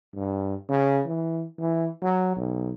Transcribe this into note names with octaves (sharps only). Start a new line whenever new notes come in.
G2
C#3
E3
E3
F#3
B1